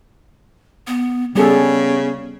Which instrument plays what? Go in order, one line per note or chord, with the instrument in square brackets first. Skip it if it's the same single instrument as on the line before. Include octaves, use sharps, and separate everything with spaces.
[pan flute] B3
[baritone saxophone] C#3 [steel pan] G3 G#4 A4 [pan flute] B3